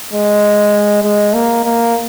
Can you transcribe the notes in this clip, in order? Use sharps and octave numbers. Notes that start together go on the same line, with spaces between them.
G#3
G#3
A#3
A#3